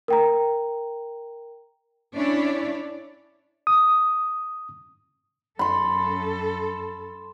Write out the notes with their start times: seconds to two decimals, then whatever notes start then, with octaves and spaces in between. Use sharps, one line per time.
0.08 A#4 G5 A#5
2.15 C#4 D4 E4 C#5 D5
3.67 D#6
5.59 F#2 A4 B5 C6